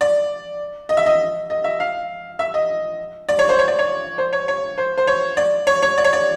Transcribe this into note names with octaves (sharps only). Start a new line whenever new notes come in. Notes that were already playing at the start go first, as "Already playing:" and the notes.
D5
D#5
E5
D#5
D#5
E5
F5
E5
D#5
D5
C#5
C5
C#5
D5
C#5
C5
C#5
C#5
C5
C5
C#5
D5
C#5
C#5
D5
C#5
D5